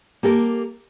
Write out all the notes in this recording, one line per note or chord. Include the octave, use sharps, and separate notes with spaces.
A#3 G4 A4 A#4